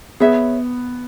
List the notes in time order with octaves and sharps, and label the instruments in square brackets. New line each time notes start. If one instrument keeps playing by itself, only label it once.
[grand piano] B3 [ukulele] G#4 C#5 E5